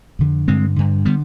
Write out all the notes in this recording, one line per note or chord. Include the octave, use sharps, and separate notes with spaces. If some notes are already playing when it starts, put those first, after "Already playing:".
F2 D3
G2 D3 G#3 C4
G2 D3
D3 G3 B3